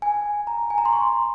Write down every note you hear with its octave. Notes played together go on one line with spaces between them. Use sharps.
G#5
A#5
G#5
A#5
C6
C#6